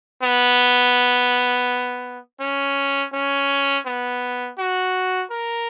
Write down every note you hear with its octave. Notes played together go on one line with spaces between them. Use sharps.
B3
C#4
C#4
B3
F#4
A#4